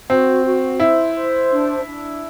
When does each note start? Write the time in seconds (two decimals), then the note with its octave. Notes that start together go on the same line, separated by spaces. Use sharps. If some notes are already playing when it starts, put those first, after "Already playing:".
0.09 C4 F#4
0.45 F#4
0.80 E4 C5
1.15 C5
1.51 D4
1.86 D4